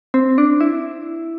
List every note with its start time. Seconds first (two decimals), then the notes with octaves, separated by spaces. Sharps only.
0.14 C4
0.38 D4
0.61 E4